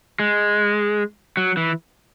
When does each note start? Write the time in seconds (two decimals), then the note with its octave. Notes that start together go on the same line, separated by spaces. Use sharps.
0.19 G#3
1.37 F#3
1.57 E3